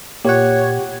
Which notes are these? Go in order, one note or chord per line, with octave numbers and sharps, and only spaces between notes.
A#2 G4 C#5 F#5